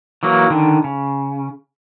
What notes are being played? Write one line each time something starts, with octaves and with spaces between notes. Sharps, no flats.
E3 F#3 A#3
D3 D#3
C#3